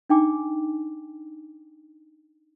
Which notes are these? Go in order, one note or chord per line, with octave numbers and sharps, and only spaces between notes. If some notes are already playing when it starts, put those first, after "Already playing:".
D4 D#4 G5 G#5 D6